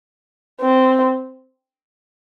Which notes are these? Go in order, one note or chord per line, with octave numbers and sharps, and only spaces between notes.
C4